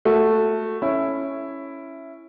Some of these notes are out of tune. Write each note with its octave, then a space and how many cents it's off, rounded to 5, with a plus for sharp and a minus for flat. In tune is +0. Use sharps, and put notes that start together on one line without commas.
A3 +0 F#4 -15
C#4 -5 E4 +5